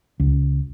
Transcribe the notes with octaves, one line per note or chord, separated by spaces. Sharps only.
C#2